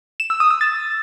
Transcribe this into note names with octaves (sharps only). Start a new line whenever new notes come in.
E7
E6
D#6
E6
A6